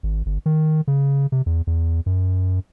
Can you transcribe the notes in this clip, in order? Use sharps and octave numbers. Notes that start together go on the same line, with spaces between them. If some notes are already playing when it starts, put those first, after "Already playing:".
G#1
G1
D#3
C#3
C3
E2
E2
F#2